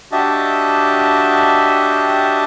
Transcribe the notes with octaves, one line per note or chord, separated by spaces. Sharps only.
D4 F#4 G4 D#5 E5 A5